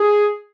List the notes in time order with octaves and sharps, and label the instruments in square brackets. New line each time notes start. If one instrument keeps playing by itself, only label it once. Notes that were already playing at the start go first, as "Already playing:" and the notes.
Already playing: [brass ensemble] G#4